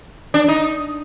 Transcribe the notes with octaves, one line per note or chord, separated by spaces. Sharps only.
D4
D#4